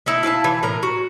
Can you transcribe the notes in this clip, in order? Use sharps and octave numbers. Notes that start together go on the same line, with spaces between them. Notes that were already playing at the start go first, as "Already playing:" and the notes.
A3 D#4 E4
E4 F5 G#5 A5
E3
A2 A#4 A#5
F#4